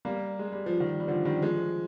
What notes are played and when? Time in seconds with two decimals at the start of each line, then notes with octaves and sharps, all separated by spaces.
0.05 G3 A#3
0.39 G#3
0.52 G3
0.66 F3
0.80 D#3 G3
1.00 G3
1.08 D3 F3
1.25 D#3 G3
1.42 F3 G#3